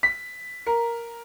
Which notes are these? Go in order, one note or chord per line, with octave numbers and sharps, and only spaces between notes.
B6
A#4